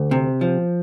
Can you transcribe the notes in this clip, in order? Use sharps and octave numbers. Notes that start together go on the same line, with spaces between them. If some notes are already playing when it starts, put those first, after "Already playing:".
Already playing: D2
C3
F3